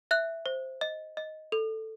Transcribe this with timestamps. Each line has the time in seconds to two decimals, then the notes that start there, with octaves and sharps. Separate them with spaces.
0.11 E5 F#6
0.46 C5
0.81 D#5
1.17 D#5
1.52 A4